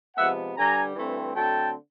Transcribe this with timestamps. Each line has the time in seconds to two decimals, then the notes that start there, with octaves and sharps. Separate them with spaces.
0.16 C3 F3 G#3 B3 E5 F#5
0.56 G2 D3 G3 G#5 A#5
0.96 G2 E3 A3 C4
1.35 D3 F#3 A3 C4 G5 A5